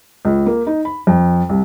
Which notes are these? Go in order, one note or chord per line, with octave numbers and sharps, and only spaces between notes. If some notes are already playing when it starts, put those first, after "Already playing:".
C#2
A#3
D#4
B5
F2
C2